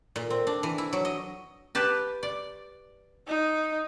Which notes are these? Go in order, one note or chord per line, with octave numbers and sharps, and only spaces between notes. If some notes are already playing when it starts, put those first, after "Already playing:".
A#2
C4
D4
E3
E4
F#3
D#5
G4 B4 A5
D5
D#4